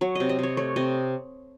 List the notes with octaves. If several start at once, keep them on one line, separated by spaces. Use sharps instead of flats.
F#3 C#5
C3 D#5
D#5
C3 C#5
A3 C#5
C3 D#5